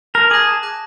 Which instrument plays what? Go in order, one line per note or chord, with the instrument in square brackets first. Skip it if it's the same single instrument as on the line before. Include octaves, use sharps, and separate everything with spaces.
[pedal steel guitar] A#4 [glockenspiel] A5
[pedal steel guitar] G#4 [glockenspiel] D6 F#6 A#6
[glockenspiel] A5
D6 F#6 A#6